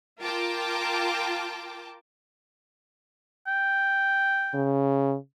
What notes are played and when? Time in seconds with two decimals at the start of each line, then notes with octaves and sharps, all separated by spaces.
0.21 F4 A#4 G5 A5 D6
3.47 G5
4.54 C#3